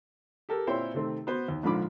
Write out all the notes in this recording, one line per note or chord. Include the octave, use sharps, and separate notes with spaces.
G4 A4 A#4
A#2 C4 E4 C5 C#5 G5
C3 D#3 A3 C4
B3 F#4 C5
D#2
A#1 G#2 D3 F3 B5 D6